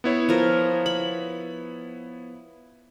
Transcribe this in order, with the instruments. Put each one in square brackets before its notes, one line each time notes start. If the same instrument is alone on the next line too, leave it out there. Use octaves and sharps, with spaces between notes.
[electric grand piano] B3 E4 C#5
[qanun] F3 A#4
B5